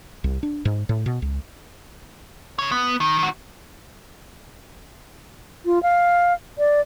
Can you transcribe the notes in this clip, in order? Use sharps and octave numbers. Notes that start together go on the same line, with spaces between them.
C2
D4
G#2
A2
B2
C#2
C#3 C#5
B3
D#3
D#3 F#4
F4
F5
D5